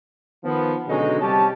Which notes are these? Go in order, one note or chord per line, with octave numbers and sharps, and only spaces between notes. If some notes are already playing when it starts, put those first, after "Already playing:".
D#3 F3 B3
B2 D3 F#3 G#3 C#4 D#4
C3 G3 C#4 G4 A5